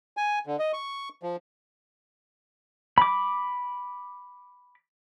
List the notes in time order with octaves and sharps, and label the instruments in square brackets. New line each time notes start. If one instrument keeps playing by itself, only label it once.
[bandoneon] G#5
D3
D#5
C#6
F3
[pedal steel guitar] B5 D6